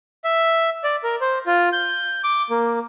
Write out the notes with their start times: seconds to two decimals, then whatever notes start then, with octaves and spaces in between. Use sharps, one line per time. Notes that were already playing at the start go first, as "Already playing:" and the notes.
0.24 E5
0.84 D5
1.04 A#4
1.21 C5
1.46 F4
1.73 G6
2.24 D6
2.50 A#3